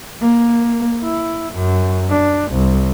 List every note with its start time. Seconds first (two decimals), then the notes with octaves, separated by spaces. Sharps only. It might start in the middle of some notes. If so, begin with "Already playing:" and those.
0.21 A#3
1.04 E4
1.54 F#2
2.10 D4
2.52 C2